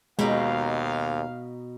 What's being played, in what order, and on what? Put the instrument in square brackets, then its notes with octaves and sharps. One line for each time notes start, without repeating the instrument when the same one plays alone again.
[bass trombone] D#2 [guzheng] B2 D#4 [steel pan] G#3 [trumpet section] F5